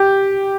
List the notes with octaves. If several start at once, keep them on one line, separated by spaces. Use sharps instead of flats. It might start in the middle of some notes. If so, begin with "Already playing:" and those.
Already playing: G4